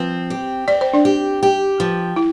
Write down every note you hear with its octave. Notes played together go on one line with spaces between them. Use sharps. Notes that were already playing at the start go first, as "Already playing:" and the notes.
Already playing: F3 C4
G4
C4 D5
C5
D4 D5
G4
G4
F3
E4